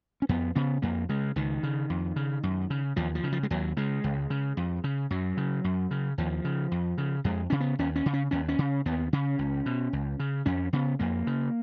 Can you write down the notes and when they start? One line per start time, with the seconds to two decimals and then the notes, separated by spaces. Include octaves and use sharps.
0.22 C#4
0.29 F2 B3
0.55 C#3 B3
0.82 F2 A#3
1.09 C#3 G#3
1.36 C#2 D#3
1.63 C#3
1.90 F2
2.16 C#3
2.43 F#2
2.70 C#3
2.96 D#2 F3
3.15 F3
3.24 C#3
3.32 F3
3.43 G#3
3.50 D#2 F#3
3.77 C#3 G#3
4.04 C#2
4.30 C#3
4.57 F2
4.84 C#3
5.10 F#2 F#3
5.37 C#3
5.64 F#2
5.91 C#3
6.18 D#2 F3
6.45 C#3
6.72 F2
6.98 C#3
7.24 F2 G#3
7.50 C#3 C#4
7.60 B3
7.79 D#2 C#4
7.96 C#4
8.06 C#3
8.13 C#4
8.31 D#2 C#4
8.49 C#4
8.59 C#3
8.86 D#2 B3
9.13 C#3 C#4
9.39 C#2
9.66 B2
9.93 C#2
10.20 C#3
10.46 F2 C#4
10.73 C#3 B3
10.99 F2 A#3
11.27 C#3